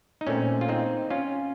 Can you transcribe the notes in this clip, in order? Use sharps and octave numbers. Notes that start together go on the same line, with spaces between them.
D#4
A#2 A3 C4 C#4
F4
C4 D#4
C#4 F4